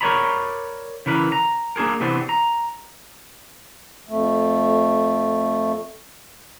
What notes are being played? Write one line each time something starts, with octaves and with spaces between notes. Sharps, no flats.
A#4 C#5 D5 A#5 B5
C#3 E3 A#4 B4
A#5
A#3 D4 F#4 G#4 A#4
C3 E3 B3 C4 D4
A#5
F2 A3